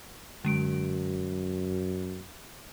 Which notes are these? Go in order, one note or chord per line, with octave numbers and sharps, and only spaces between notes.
F#2 D3 G#3 D7